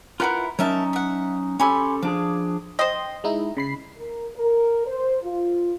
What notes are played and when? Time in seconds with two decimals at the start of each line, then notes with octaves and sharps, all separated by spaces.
0.20 E4 F4 G4 A#4 B4 F#5
0.59 F#3 C#4 D#4 A#4 E5 A5
0.93 E5 F#5
1.60 C#4 G4 A4 G#5 B5 C6
2.02 F3 D4 G#4 D6
2.79 C5 D#5 G5 C6
3.24 G#3 D#4 E4
3.57 C#3 B5 C7
3.97 A#4
4.34 A#4
4.87 C5
5.24 F4